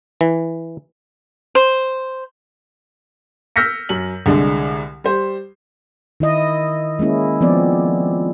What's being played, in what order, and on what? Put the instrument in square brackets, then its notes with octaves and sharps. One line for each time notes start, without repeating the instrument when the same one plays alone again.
[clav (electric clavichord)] E3
[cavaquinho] C5
[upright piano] E6 F6 G6 A#6 B6 C#7
F#2 F#7
C2 D3 G#3 D4
G3 C5
[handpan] D#3 E4 D#5
G#3 A#3 C#4 E4
F3 B3 C4 D5